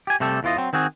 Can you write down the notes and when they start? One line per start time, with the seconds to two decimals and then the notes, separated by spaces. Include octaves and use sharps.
0.07 G4 G#5
0.20 C3 G3 A3 G4 A4
0.43 E2 E3 F4 D#5
0.57 F#3 C4
0.73 D#3 C4 F#4 G#4